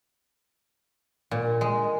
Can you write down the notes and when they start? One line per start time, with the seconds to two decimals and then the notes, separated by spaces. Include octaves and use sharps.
1.31 A#2
1.61 G#3